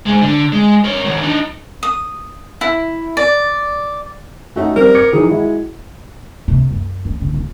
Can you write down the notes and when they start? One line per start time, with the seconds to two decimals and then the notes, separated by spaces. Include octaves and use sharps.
0.06 G#2 G#3
0.22 D3
0.52 G#3
0.84 A#4 C#5
1.05 D#3 F#3
1.23 D4 D#4
1.83 D#6
2.61 E4
3.17 D5
4.56 A3 C#4 D#4 F#4
4.76 G3 C4 A#4
4.95 D6 G#6 C#7
5.12 D#3 E3 F#3 G#4
5.29 G#3 E4 F#4
6.48 C3
6.71 F#2
7.05 C#4
7.21 D3
7.34 D#1